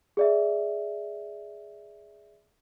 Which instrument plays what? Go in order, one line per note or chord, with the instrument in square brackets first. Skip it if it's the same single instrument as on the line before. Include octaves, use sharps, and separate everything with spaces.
[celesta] G#4 D5 E5